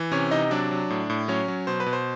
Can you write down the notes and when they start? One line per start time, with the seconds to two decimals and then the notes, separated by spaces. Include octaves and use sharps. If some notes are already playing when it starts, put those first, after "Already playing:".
Already playing: E3
0.11 C3 C#4 C#5
0.31 C3 D#4 D#5
0.51 F#3 D4 D5
0.71 F#3
0.90 A2
1.10 A2
1.28 F#3 C#4 C#5
1.48 F#3
1.67 B2 C5
1.80 B4
1.86 B2
1.93 C5